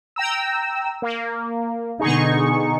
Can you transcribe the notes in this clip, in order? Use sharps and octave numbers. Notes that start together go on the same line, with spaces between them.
G5 A#5 E6
A#3
B2 D3 B3 D#4 G#4 C#6